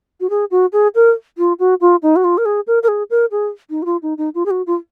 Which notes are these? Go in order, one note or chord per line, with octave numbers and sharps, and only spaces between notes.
F#4
G#4
F#4
G#4
A#4
F4
F#4
F4
D#4
F#4
F4
A#4
G#4
A#4
A#4
G#4
A#4
G#4
D#4
F#4
F4
D#4
D#4
F4
G#4
F#4
F4